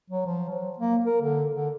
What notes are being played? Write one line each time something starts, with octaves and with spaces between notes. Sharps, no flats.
F#3
F3
F#3
A#3
A#4
D3
D3